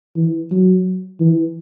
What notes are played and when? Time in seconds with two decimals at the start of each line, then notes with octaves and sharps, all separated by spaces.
0.16 E3
0.51 F#3
1.20 E3